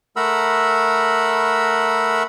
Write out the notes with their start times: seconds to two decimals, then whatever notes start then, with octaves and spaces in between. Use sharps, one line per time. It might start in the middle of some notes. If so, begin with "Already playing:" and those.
0.16 A3 A#4 F#5 A#5 B5 E6